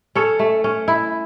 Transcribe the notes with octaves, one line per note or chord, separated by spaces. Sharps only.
C#4 A4 C#5
A3
C#4
E4